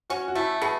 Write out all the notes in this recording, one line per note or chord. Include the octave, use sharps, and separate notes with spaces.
C#4 F#4
F#4
A3 E4
B2 G#4